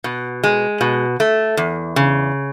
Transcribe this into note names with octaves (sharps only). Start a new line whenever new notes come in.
B2
G#3
B2
A3
E2
C#3